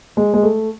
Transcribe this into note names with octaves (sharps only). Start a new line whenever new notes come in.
G#3
G#3
A3